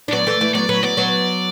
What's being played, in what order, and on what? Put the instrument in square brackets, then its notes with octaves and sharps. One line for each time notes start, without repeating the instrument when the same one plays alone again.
[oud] D4
[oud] F#3 B3 [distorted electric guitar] D5
[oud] E3 A3
E3 A3
[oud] F#3 B3 [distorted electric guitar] D5
[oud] F#3 B3 [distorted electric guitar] B4
[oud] F#3 B3 [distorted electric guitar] D5
[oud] F#3 B3